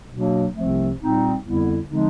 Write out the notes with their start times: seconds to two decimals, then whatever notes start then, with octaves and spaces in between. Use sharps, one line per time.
0.10 B2 F#3 A#3 D4
0.55 C2 C3 F3 A3 C4
0.99 A#2 G3 C4 D#4
1.43 F2 D3 G3 B3 E4
1.87 D3 F3 G#3 C4 D#4